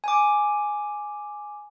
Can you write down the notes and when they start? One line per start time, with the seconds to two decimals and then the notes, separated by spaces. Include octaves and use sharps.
0.04 G#5 D6